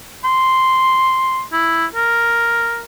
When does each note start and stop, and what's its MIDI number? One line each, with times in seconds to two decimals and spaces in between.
0.24 1.41 84
1.53 1.86 64
1.95 2.83 70